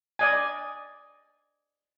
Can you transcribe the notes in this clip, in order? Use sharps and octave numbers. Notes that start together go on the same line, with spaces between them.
D5 D#5 G#5